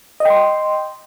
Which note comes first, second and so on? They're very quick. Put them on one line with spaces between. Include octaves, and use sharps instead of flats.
D#5 G5 C6